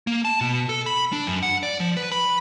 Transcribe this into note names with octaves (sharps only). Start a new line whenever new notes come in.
A#3
A5
B2
A4
B5
D4
F#2
F#5
D5
F3
B4
B5